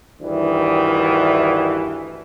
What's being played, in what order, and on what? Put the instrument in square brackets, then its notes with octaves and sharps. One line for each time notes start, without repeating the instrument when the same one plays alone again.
[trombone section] D2 G2 D#3 E3